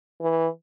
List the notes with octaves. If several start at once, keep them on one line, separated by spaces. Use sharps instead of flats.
E3